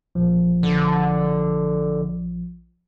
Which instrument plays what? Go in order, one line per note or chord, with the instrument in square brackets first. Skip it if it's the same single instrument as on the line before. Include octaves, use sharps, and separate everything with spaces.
[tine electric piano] A#1 F3
[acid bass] D3